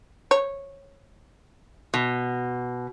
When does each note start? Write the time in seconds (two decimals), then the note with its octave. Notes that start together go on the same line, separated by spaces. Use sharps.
0.31 C#5
1.94 B2